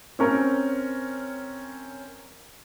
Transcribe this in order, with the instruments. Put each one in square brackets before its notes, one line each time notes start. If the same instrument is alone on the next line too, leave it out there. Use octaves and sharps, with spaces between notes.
[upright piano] C4 C#4 A#4 C#5